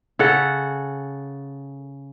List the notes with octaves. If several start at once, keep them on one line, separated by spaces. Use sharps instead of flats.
C#3 A4 F#5